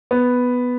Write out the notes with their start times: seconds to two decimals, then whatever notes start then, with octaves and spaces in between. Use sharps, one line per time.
0.11 B3